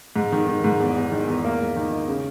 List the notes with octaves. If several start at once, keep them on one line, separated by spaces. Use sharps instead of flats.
G#2
D#3
D#3
G#2
E2
E2
D#3
E2
A#3
G#2
D#3
D#4
C#3